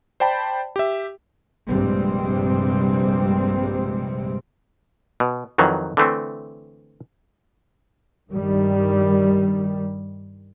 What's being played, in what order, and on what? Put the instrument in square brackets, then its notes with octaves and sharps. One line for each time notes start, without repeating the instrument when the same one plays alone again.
[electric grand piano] C5 D5 G5 A5 B5
G4 E5
[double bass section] A#1 G2 C3 G3 G#3 C4
[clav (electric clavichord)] B2
F2 D#3 E3 F#3
D3 E3 A3 C4
[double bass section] G2 D#3 G3